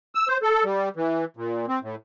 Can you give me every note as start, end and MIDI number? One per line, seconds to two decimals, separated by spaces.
0.15 0.28 88
0.28 0.37 72
0.42 0.64 69
0.64 0.89 55
0.96 1.25 52
1.37 1.66 46
1.68 1.79 60
1.83 1.95 45